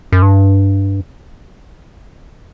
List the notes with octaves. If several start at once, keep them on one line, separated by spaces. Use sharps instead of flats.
F#2
G2